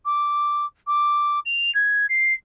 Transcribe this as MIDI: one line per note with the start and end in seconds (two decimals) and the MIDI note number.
0.05 0.65 86
0.87 1.39 86
1.45 1.73 101
1.74 2.06 92
2.09 2.34 96